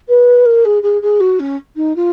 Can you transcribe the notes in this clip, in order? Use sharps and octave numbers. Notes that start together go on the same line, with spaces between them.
B4
A#4
G#4
G#4
G#4
F#4
C#4
D#4
F4